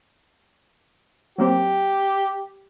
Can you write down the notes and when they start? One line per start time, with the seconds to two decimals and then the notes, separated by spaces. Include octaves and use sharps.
1.38 F#3 A#3 C4 G4